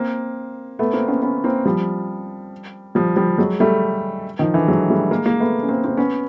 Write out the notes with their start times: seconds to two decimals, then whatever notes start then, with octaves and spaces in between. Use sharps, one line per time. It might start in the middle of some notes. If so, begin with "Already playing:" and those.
Already playing: A#3 C4
0.79 A3 B3
0.93 A#3 C4
1.08 B3 C#4
1.22 B3 C#4
1.44 A#3 C4
1.65 F3 G3
2.95 F3 G3
3.16 F3 G3
3.38 F#3 G#3
3.60 G3 A3
4.39 D#3 F3
4.54 D3 E3
4.68 F#3 G#3
4.90 G3 A3
5.11 G#3 A#3
5.26 G#3 A#3
5.40 A3 B3
5.63 C#4
5.68 A#3 C4
5.84 A#3 C4
5.97 B3 C#4